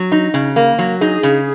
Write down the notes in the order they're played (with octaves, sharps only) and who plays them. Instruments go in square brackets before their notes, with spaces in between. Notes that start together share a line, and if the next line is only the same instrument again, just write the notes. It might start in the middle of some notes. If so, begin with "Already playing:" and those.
Already playing: [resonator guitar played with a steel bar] F#3
D#4
C#3
A#3
F#3
[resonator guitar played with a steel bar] D#4 [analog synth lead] G#4
[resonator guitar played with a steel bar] C#3